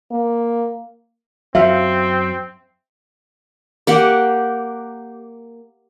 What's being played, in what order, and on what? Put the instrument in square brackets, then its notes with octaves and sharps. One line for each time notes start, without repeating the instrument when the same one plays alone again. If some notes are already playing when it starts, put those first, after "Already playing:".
[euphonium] A#3
[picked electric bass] F#2 F#3 [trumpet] C4 [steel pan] E5 F5
[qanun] A#3 G4 F#5